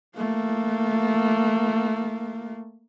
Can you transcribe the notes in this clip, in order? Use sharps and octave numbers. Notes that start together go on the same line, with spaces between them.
A3 A#3